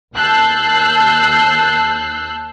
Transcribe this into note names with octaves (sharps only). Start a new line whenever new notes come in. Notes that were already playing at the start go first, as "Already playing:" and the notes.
D#2 A5 E6 F#6 G6 C7